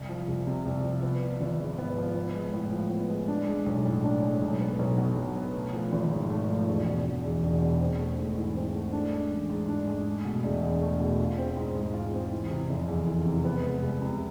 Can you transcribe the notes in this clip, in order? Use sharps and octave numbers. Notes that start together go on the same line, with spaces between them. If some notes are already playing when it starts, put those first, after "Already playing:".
Already playing: C2
F3
C2
C3
C2
F3
B3
F3
G#1
G#2
B3
F3
B3
G#3
A2
F3
B3
G#3
D4
G#3
B1
A2
D4
G#3
B1
B3
B1
B2
B1
B3
A3
F3
G#1
G#2
A3
F3
E1
B2
E1
E2
E1
B2
C4
A3
G#2
E3
C4
A3
D4
G#3
A1
G#2
D4
G#3
A3
B2
E1
E2
A3
B2
F4
C4
G#2
G#3
F4
C4
E3
C3
F1
E2
E3
C3
B3
G#3
C2
C3